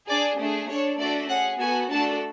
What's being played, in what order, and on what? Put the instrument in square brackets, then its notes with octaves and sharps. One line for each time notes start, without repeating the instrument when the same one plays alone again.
[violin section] D4 G#4 D5
A3 D4 G#4
D4 A4 C#5
A3 D4 F#4 A4 D5
C#4 G#4 F#5
B3 F#4 A4 G#5
A3 D4 F#4 A4 A5